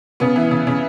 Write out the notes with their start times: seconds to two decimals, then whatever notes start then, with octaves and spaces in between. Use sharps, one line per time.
0.20 C#3 B3
0.36 E3
0.51 C#3
0.67 C#3